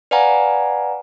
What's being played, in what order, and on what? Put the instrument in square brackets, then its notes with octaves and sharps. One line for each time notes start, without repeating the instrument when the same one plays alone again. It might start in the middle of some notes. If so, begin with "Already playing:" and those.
[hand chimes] B4 D5 F5 F#5 G#5 A#5